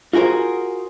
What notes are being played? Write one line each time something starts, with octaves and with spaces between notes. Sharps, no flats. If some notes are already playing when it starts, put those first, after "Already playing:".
F4 F#4 G#4 A#4 C5